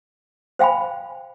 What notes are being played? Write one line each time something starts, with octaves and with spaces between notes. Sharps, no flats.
C5 F5 G5 G#5 B5